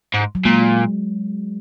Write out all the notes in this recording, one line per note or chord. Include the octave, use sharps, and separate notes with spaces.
G#2
F#3
A#2 G#3